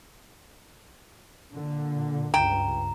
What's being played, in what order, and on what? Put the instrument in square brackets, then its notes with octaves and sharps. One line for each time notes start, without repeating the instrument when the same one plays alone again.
[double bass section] A#2 D3
[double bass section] C#2 G2 [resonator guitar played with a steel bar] G5 [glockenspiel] A#5